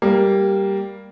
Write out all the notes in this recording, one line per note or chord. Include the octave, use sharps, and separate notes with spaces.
G3 A#3